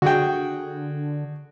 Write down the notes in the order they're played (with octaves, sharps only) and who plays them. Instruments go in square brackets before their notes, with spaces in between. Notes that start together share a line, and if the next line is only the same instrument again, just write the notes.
[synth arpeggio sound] D3 [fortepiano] F#4 G#4 G5